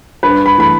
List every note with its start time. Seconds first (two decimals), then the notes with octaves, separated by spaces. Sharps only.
0.23 G2 B4
0.46 B5
0.58 E3 A3 B5